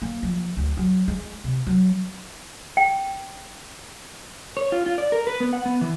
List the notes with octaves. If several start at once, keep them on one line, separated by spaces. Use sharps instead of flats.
A#3
F3
D2
F#3
G#3
C3
F#3
G5
C#5
F4
F4
D5
A#4
B4
B3
F#5
B3
E3